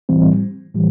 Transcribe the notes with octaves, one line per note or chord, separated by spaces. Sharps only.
A2 E3 G3 C4
A2 E3 G3